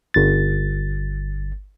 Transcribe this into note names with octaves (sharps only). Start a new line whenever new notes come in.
G1 A6